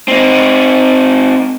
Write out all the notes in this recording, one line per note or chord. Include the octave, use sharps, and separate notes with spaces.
C4 D#4